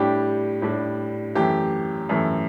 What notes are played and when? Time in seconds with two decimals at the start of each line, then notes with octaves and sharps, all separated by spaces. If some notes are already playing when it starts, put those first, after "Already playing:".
Already playing: A2 G3 D4 G4
0.62 A2 G3 D4
1.35 F#2 E3 A3 G4
2.09 F#2 E3 A3